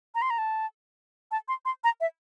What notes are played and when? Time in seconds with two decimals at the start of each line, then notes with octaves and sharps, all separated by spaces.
0.15 A#5
0.22 C6
0.30 A#5
0.38 A5
1.31 A5
1.48 C6
1.65 C6
1.84 A#5
2.01 E5